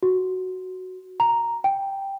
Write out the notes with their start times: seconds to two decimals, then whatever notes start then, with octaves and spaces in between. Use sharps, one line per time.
0.03 F#4
1.20 A#5
1.64 G5